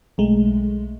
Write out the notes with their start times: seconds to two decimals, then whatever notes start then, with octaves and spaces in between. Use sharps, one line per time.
0.18 B1 G#3 A3